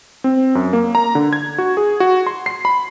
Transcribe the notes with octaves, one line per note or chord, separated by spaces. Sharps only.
C4
F#2
A#3
A#5
D3
G#6
F#4
G#4
F#4
C6
C7
B5